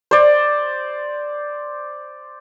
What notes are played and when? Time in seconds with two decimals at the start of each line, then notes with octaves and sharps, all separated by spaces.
0.11 C5 D5